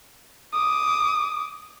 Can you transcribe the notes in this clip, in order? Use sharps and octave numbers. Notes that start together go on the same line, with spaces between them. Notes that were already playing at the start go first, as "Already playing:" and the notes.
D6 D#6